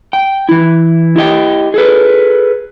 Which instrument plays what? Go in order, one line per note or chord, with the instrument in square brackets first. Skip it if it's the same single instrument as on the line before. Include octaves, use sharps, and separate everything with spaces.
[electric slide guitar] G5
E3 E4
E4 G4 D#5 G5
G#4 A4 B4